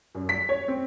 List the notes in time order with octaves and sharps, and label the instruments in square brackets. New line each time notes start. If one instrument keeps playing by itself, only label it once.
[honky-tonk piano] F#2
B6
C#5
C4